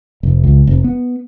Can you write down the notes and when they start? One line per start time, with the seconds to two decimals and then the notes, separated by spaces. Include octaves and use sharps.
0.23 F1
0.44 C#2
0.67 F1
0.84 B3